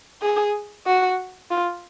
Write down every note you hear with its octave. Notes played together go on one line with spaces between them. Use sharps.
G#4
F#4
F4